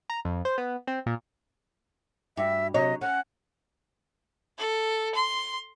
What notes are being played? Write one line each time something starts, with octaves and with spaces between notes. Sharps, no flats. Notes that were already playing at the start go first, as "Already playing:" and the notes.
A#5
F2
C5
B3
C4
A#2
G2 F#4 E5
C3 F#3 C#5 D#5
C#4 F#5
A4
C6